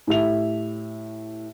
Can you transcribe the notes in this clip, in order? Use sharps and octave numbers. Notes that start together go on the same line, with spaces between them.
A2 G4 E5 F7